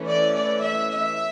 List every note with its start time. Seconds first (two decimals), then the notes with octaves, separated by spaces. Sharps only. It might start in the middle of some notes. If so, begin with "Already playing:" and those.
Already playing: E3 A3 C#4
0.08 D5
0.36 D5
0.65 E5
0.93 E5